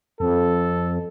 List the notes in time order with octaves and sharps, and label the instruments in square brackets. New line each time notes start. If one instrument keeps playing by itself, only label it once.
[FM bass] F2 [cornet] A4